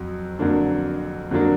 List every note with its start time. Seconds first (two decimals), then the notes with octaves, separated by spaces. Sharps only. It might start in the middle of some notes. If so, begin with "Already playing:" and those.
Already playing: F2 F#3
0.39 F2 D3 F#3 A#3 D4
1.31 F2 D3 F#3 A#3 D4